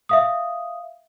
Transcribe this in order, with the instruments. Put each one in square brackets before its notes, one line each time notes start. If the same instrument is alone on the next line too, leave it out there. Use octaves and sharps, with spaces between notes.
[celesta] E5 F5 D#6